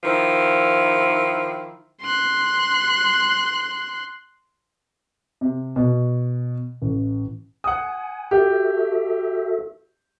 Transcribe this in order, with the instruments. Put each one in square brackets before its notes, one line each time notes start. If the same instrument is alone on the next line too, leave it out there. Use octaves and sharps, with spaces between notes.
[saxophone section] D#3 F3 E4
[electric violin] C6 F#6
[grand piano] C3
B2
A1
[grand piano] F#5 D#6 [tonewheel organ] G#5
[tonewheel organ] F#4 A4 E5 [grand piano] G4